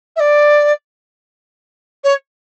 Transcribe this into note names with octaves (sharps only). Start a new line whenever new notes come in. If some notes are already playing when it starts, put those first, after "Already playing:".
E5
D5
C#5